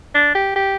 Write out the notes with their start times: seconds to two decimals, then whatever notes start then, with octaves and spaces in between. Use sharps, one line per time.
0.14 D4
0.35 G4
0.56 G4